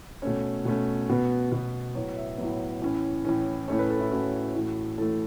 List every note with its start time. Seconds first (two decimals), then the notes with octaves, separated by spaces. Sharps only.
0.22 B2 A3 C#4 C#5
0.65 B2 A3 C#4
1.09 B2 B3
1.52 B2 B3
1.95 A2 F#3 B3 C#5
2.17 E5
2.38 A2 F#3 B3 C#5
2.82 A2 E3 C#4
3.25 A2 E3 C#4
3.68 A2 A3 C#4 C#5
3.79 B4
3.90 A4
4.00 E4
4.11 A2 A3 C#4 F#4
4.55 A2 E3 A3
4.98 A2 E3 A3 A4